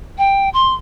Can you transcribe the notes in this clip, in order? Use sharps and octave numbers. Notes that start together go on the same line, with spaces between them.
G5
C6